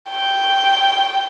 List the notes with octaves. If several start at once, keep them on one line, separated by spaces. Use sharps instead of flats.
G5